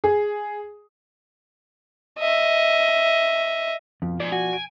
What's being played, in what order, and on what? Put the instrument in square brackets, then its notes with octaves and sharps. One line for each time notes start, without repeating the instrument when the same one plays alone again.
[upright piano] G#4
[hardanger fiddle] D#5 E5
[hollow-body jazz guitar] F2 [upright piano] B2 F3
[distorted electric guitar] G#2 [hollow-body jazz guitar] D5
[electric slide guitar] F#4 [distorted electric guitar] G#5
[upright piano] D7